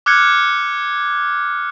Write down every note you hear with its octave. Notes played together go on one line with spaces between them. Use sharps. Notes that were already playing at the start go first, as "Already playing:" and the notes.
D6 F6 F#6 G#6 C#7